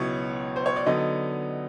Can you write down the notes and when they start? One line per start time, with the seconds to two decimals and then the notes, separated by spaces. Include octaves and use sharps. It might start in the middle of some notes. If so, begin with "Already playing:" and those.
Already playing: C#2 B2 F#3 B3 E4 C#5
0.56 C5
0.66 C#5
0.76 D5
0.86 D3 F#3 B3 D#4 D#5